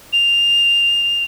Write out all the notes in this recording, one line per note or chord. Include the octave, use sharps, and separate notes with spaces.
F7